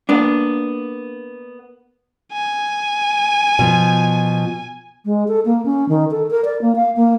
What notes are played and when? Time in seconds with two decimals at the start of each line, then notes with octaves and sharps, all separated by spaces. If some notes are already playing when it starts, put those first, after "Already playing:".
0.09 A#3 B3 D4
2.33 G#5
3.59 B2 F3
5.05 G#3
5.28 A4
5.45 A#3
5.65 C#4
5.89 D#3
6.11 A4
6.30 A#4
6.45 D5
6.62 A#3
6.76 F5
6.96 A#3